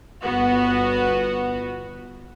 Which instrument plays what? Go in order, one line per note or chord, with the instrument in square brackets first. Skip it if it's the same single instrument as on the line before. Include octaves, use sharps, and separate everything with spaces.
[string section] G1 B3 F#4